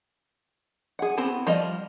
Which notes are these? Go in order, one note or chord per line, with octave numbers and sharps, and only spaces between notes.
G#4 F#5
B3 C4 E4 F#4
F3 G3 D#5